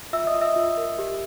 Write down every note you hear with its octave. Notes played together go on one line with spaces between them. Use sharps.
F4 E5 E6
D#5 D#6
F4
E5 E6
F4
A#4
G4